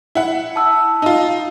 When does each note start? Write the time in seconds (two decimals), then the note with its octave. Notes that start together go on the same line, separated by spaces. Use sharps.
0.15 E4 F#5
0.56 A5 E6
1.02 D#4 F4